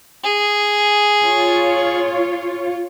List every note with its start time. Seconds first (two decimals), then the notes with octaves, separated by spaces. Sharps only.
0.23 G#4
1.23 F4 C#5